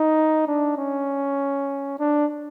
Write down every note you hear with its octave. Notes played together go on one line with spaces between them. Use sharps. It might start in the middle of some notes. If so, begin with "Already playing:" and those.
Already playing: D#4
D4
C#4
D4